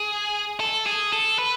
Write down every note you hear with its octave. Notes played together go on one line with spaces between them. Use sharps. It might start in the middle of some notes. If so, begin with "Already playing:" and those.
Already playing: G#4
A4
G#4
A4
B4